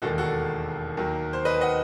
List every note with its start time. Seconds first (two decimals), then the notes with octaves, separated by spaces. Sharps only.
0.02 E1 D#2 D#3 F#4 A4
0.18 F#4 A4
0.97 D#2 D#3 F#3
1.33 C5
1.45 B4 D#5
1.61 D#5 F#5